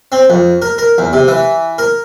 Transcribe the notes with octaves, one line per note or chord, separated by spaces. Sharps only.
C4
F2
A#4
A#4
E2
C3
E3
A#4